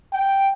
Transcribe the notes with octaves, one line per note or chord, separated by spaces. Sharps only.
G5